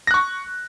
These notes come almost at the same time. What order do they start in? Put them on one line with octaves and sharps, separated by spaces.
A#6 F#6 C#6